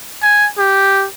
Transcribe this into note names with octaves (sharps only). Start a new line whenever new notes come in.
G#5
G4